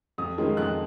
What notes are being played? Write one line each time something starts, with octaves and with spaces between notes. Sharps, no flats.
F2 D#6
D#3 G#3 C#4 F4
F2 F#6